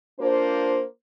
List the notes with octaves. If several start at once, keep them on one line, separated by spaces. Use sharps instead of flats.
A#3 D4 F4 C5